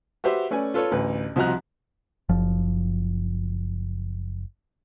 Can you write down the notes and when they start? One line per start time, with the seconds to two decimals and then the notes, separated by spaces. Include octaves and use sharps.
0.24 F#4 G4 B4 C5 E5
0.51 A3 C#4 B4 D5 G#5
0.74 F4 A4 B4 C#5
0.91 A1 D2 B4
1.36 C2 F3 F#4 D#5 A#5 F#6
2.29 F#1 F3